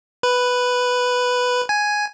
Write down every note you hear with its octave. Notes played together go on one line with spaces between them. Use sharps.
B4
G#5